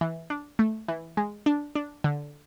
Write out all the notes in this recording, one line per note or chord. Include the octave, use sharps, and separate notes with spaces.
E3
D4
A3
E3
G#3
D4
D4
D3